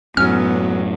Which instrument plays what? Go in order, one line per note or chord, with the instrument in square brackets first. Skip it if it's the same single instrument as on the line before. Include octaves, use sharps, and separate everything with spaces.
[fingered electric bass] F#2 A2 [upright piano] F#3 C#4 [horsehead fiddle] B3 [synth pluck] F6